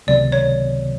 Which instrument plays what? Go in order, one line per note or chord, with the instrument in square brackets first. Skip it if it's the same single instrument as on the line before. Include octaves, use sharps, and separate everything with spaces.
[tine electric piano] C#2 C3 D#3 F#3 B3 [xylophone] D5
[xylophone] C#5